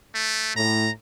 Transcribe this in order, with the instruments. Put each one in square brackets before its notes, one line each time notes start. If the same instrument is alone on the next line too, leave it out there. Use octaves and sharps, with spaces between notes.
[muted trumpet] A3
[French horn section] A2 [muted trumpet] A#5